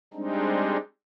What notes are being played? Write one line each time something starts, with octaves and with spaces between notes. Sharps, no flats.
G3 G#3 C4 D4 D#4